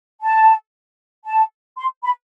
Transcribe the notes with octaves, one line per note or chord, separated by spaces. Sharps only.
A5
A5
C6
B5